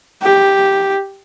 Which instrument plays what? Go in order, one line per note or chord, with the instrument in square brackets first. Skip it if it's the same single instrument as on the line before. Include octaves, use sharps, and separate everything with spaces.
[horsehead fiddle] G4